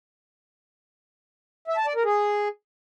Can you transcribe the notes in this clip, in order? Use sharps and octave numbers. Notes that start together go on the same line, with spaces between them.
E5
A5
D5
A#4
G#4